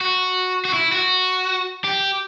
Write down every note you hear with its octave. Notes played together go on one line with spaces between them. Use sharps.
F#4
F#4
E4
F#4
G4